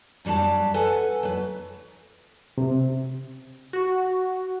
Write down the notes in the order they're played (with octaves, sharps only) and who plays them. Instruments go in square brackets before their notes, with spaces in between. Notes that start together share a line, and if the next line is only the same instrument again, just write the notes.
[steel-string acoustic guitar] F#2 F#3 G3 D4 A5
A4 B4 F#5 G#5
F#3 B4
[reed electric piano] C3
[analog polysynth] F#4